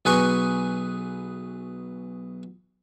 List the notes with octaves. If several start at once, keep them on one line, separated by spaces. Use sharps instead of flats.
B1 G#4 B4 G#5 C#6